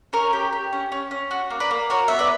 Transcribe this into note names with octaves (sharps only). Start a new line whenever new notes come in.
C#4 A#4 C#5
G4
G4
C#4
C#4
C#4
F#4
A#3
B4 D5
A#3
F#4 A#4 C#5
B3 E5
B4 D5